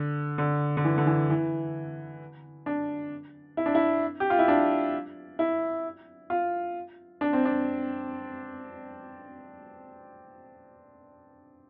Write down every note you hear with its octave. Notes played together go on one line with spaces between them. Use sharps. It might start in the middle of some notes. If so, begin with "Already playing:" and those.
Already playing: D3
D3
D3
E3
D3
E3
E3
D4
E4
D4
E4
G4
F4
E4
D4
E4
F4
D4
C4
D4